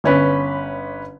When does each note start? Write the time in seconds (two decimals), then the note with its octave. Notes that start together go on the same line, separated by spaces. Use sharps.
0.04 G1 C#4 B4